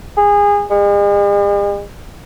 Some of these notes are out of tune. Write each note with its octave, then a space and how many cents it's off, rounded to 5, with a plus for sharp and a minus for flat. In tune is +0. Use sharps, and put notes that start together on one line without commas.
G#4 -25
G#3 -45